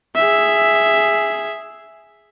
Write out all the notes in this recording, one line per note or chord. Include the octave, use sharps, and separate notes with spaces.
G#4 E5